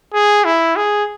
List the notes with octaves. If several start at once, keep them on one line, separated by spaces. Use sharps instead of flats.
G#4
E4
G#4